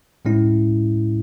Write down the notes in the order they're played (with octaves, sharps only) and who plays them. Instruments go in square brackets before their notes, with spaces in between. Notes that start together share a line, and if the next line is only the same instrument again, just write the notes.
[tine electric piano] A2 G#3 C#4 E4